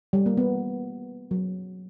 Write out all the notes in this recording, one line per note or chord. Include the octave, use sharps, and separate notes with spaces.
G3
A#3
B3
F#3